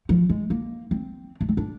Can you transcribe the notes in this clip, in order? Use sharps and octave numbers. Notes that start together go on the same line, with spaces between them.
F3
G#3
A#3
C4
D4
C4
D4